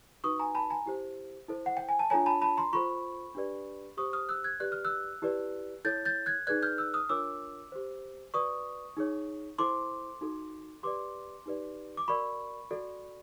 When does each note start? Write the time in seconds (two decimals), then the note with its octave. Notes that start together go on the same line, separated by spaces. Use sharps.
0.24 D#4 F#4 B4 C#6 D#6
0.39 G#5 A#5
0.55 A5 B5
0.70 G#5 A#5
0.86 E4 G4 C5
1.48 E4 A4 C5
1.66 F#5
1.77 G5
1.89 G#5
1.99 A5
2.10 D4 F4 A4 C#5 G#5 A#5
2.26 A5 B5
2.42 A5 B5
2.57 A#5 C6
2.73 F4 A4 C5 B5 C#6
3.35 D4 G4 B4 D5
3.97 G4 C5 C#6 D#6
4.13 D#6 F6
4.29 E6 F#6
4.44 F#6 G#6
4.60 G4 B4 D5 F#6
4.72 F6
4.85 E6 F#6
5.22 E4 G4 B4 D5
5.85 E4 A4 C#5 G6 A6
6.05 G6 A6
6.26 F#6 G#6
6.47 D#4 G#4 B4 D5 F#6 G#6
6.62 F6 G6
6.78 E6 F#6
6.94 D#6 F6
7.09 D4 F4 A#4 C#5 D6 E6
7.72 G4 C5
8.34 F#4 B4 D5 C#6 D#6
8.97 D#4 G#4 C#5
9.58 E4 A4 C5 C6 D6
10.21 D#4 F#4 A4
10.83 G4 B4 D5 C6 D6
11.46 D#4 G4 B4 D5
11.97 D6
12.08 F#4 A#4 D5 B5 C#6
12.71 F#4 A4 D5